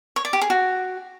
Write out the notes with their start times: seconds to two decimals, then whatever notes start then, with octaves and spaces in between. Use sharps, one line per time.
0.16 C#5
0.25 D5
0.33 G4
0.41 G#4
0.50 F#4